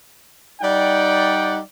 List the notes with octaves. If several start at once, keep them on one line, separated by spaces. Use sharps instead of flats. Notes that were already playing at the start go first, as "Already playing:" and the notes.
G3 D#4 D5 F#5 G5